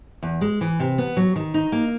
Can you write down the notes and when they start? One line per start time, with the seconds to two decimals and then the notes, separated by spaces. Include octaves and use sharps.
0.23 E2
0.41 G#3
0.61 E3
0.80 C3
0.98 B3
1.17 F#3
1.36 D#3
1.54 D#4
1.72 A#3